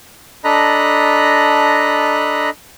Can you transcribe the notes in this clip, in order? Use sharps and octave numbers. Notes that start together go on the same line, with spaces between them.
D4 A4 D#5 A#5 B5 F#6